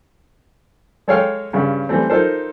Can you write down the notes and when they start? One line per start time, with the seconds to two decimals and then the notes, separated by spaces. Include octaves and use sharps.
1.08 G#3 A4 C#5 D#5 F5 G5
1.53 G2 C#3
1.89 E3 G3 A3 C4
2.10 D#4 F4 A4 A#4 C5